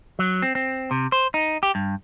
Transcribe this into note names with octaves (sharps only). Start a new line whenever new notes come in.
F#3
C4
C4
C3
C5
D#4
G4
G2